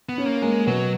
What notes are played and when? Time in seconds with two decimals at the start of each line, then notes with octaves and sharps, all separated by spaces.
0.09 B3
0.18 C#4
0.26 A#3
0.42 G#3 A#3
0.67 B2 F#3